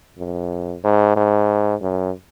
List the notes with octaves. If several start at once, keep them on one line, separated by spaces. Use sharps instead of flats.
F2
G#2
G#2
F#2